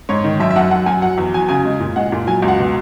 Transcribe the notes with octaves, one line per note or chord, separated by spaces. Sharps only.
G#2 C#5
D#3
F#2 E5
E5
F#2 F#5
F#2 F#5
F#2 G#5
F#3 F#5
E2
F#3 G#5
C#3 G#5
G#3
A#2
G#3 F#5
A#2
F#3 G#5
C#2
F#5
B2